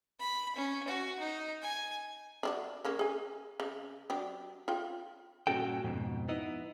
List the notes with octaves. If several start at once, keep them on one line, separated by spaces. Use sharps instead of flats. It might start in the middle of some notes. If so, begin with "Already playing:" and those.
B5
C#4
F#4
D#4
G#5
D4 E4 F#4
C#3 A#3 C#4
G#4 G#5
C#3
F#3 D4 G4
F4 G5
G2 A#2 C#4 F#4 A4 G5
F2 G#2 B2
B3 D#4 E4 D#5